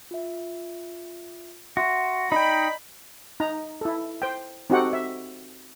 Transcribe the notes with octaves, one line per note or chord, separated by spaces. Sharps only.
F4 E5
F#4 E5 C6 C#6
D#4 D5 D#5 G5 B5
D#4 A#5
E4 A4
C5 G5
C4 D#4 F#4 G4 A4 F#5
E5